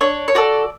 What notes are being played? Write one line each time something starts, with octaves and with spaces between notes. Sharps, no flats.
D4 C#5
C#5
F#4 A4 D5